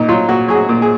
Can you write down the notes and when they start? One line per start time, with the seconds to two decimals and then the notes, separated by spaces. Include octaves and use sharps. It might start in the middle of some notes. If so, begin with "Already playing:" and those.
Already playing: A#2 D#4
0.08 F#3 F4
0.29 A#2 F#4
0.48 F#3 G#4
0.55 F#4
0.69 A#2
0.82 G#4